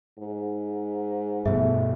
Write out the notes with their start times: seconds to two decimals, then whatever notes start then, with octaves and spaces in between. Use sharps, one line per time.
0.19 G#2
1.46 G2 B2 F3 A3 G#4 E5